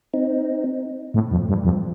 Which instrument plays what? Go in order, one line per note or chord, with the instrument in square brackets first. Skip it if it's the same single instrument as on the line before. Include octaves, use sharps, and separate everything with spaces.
[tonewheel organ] C4 D#4
[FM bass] A2
F2
G2
F2